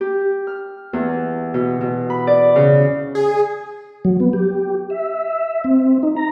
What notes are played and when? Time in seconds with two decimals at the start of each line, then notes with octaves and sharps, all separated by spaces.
0.01 G4
0.47 F6
0.93 E2
1.54 B2
1.81 B2
2.10 B5
2.27 D5
2.56 C#3
3.15 G#4
4.05 F#3
4.20 B3
4.33 G4
4.90 E5
5.64 C4
6.03 D#4
6.16 A#5